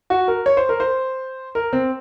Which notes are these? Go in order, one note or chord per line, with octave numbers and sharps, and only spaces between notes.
F#4
A#4
C#5
C5
A#4
C5
A#4
C4